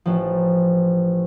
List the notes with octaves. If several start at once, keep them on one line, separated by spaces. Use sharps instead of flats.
A1 F3